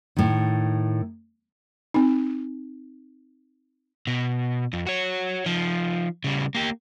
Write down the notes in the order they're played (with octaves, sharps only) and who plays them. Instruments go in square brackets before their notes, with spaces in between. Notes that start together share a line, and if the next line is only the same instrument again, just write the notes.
[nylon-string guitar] A2 D#3
[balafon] C4 D#4
[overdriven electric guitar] B2
F2
F#4 C#5
F3 D#4
C#3 G3
A#3 G4